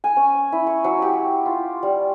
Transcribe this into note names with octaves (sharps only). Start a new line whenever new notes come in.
G#5
C#4
E4
C#6
F#3
G4
F4
G3